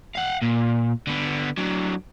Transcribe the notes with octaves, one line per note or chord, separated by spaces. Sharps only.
F5 F#5
A#2
D3 B3
D3 F#3